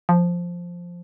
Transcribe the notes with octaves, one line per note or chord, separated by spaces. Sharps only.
F3